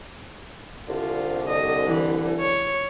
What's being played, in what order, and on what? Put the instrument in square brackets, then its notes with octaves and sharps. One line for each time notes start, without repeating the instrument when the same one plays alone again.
[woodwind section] C2 D3 [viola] F4
[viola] D#5
E3
C#5